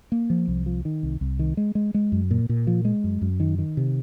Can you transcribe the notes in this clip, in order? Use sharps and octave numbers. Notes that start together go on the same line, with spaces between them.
A#3
F3
C2
F3
D#3
C2
C2
D#3
G#3
G#3
G#3
F#2
A#2
A#2
F3
G#3
F#2
F#2
D#3
D#3
C3